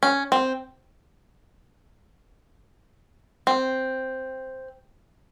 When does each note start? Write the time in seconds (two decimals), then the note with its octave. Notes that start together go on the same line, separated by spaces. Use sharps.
0.03 C#4
0.32 C4
3.47 C4